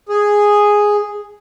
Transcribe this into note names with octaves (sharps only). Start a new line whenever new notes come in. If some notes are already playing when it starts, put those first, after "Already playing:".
G#4